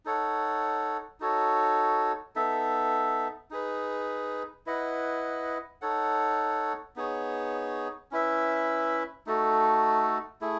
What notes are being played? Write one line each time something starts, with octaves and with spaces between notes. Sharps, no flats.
D#4 A4 C#5 F#5
D#4 F#4 A4 C#5
B3 D#4 A4 E5
D#4 G#4 B4
E4 B4 D#5 F#5
D#4 A4 C#5 F#5
B3 D#4 G#4 C#5
C#4 E4 B4 E5
A3 D#4 F#4 A4
A3 E4 G#4